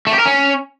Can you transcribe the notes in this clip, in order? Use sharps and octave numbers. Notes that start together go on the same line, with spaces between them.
A3
G4
A#4
C#4